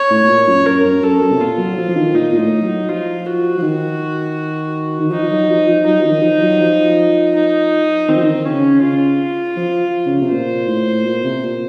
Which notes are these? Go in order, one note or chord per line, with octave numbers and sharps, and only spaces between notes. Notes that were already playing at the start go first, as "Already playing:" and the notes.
Already playing: C#5
A2
A2
A#2
F#2
F#2 A#4
F#2
F#2 A4
F#2
C3
A#2 F4
F#3
F3
F3
D#3
A#2 D#4
A#2
A2
F#3
F3 F4
F#4
F3
D#3
D#3
F3 D#4
F3
F#3
F3
F3
F#3 D#4
F3
D#3
F3
F#3
F3
D#4
D#3 C4
F3
D#3
D#3
C#3 C#4
C#3 F4
F3
C#3
C3
A#2 C5
A2
A#2
C3
A#2